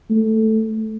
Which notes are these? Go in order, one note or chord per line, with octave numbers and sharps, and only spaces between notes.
A3